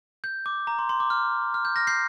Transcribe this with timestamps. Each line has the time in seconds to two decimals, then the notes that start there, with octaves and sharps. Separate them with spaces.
0.24 G6
0.46 D6
0.67 A#5
0.79 C6
0.89 C6
1.00 D6
1.10 F6
1.54 F6
1.65 G6
1.76 F6 A#6
1.87 G6 C7